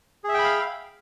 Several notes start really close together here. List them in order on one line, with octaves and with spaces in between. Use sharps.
G#4 E5 G5 B5 F5